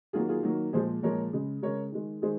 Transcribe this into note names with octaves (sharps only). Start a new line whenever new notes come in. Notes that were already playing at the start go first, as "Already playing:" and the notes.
D#3 F#3 A#3 F4 G#4
F4 G#4
D#3 F#3 A#3
A#2 F3 G#3 G#4 C5
A#2 F3 G#3 A#4 C#5
C#3 G#3
C#3 G#3 A#4 C#5
D#3 G#3
D#3 G#3 G#4 C5